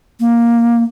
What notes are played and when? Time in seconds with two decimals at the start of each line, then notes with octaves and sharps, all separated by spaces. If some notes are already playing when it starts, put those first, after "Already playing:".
0.20 A#3